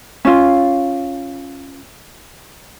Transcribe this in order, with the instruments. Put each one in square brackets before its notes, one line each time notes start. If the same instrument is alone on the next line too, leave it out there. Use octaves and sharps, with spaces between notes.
[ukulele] C#4 F4